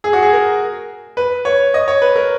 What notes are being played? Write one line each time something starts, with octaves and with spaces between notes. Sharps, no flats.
G#4
F#4
G#4
A#4
B4
C#5
D#5
C#5
B4
A#4